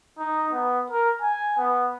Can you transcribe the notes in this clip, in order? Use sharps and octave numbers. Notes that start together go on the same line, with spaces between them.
D#4
B3
A#4
G#5
B3